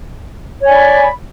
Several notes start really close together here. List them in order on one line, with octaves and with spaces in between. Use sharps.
C#5 G#5 D5 B5